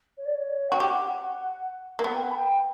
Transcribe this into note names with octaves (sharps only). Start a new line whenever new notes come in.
C#5
D5
C#5
F#4 G5
G4 F#5
A#3
B3
G5
F#5
B5
G5